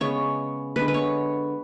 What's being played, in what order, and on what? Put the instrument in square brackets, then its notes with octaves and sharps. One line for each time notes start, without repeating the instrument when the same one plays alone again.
[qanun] C#3 G#3 B3 C#5
D3 G#3 B3 B4
B4
C#5